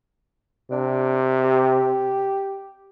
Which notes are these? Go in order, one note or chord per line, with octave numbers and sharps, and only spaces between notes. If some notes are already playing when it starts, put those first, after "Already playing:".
C3 D4
G4